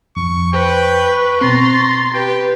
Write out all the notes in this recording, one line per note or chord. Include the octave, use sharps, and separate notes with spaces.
F2 C#6
B4 C5 G5
C#6
B2 C4 A#5 C6 A6
G4 B4 G5